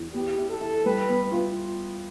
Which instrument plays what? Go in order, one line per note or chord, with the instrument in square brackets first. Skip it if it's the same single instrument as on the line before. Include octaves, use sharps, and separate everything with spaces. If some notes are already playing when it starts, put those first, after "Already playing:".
Already playing: [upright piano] E2
[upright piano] B3 [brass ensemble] G4
[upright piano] E4
[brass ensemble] A4
[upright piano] E4
[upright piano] G3 [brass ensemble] B4
[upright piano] B3
F4